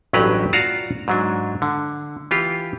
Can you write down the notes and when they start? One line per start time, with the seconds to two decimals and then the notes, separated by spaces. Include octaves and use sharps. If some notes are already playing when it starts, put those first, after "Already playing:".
0.13 A1 G2 F#3 G4 B4 A#5
0.53 F4 F#4 D5 F5 A5 A#5
1.08 G#2 F#3 D4
1.62 D3
2.31 E3 F4 G4